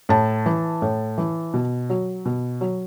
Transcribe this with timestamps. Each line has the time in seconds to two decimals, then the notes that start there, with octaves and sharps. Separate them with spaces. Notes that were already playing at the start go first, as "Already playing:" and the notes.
0.09 A2 A5
0.46 E3
0.82 A2
1.18 E3
1.54 B2
1.90 F#3
2.25 B2
2.61 F#3